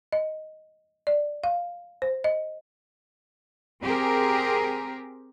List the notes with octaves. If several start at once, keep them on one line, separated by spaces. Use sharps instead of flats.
D#5
D5
F5
C5
D#5
C4 G4 G#4 A#4